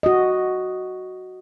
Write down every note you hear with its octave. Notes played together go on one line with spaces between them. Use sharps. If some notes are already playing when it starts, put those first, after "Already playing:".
F#4 D#5